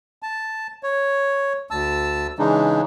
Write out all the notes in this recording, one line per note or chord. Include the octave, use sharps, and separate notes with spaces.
A5
C#5
D2 A5 E6
C#3 E3 G#3 D4 D#4